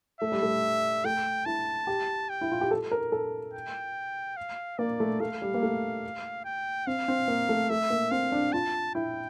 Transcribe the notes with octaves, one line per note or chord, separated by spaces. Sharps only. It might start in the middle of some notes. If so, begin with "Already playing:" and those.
A3 E5
G3
A3
A3 G5
E4 A5
G4
G5
E4
F4
G4
A4
A#4
A4
G5
F5
A#3 D5
A3
A3 F5
G3
A#3
A3
G5
C4 F5
C4
A#3
A3
A3 E5
A#3
C4 F5
D4
F4 A5
E4 G5